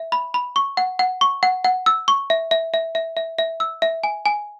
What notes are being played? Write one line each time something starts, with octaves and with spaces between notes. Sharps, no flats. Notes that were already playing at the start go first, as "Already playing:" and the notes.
Already playing: E5
B5
B5
C#6
F#5
F#5
C#6
F#5
F#5
E6
C#6
E5
E5
E5
E5
E5
E5
E6
E5
G#5
G#5